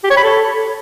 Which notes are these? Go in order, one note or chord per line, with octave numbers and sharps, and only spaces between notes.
G4
C#5
B5
A4